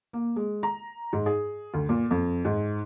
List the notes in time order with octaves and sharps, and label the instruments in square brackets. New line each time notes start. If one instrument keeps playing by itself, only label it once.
[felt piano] A#3
G#3
A#5
G#2
G#4
D2
A#2
F2
G#2